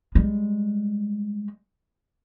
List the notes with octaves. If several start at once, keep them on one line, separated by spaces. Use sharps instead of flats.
G3 G#3